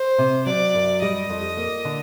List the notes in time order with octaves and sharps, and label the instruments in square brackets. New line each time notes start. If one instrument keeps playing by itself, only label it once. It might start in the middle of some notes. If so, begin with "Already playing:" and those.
Already playing: [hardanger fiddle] C5
[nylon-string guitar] C3
[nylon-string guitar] F#3 [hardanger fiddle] D5
[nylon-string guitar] F#2
[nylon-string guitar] G3 [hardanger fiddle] D#5
[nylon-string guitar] F2
A#3
D3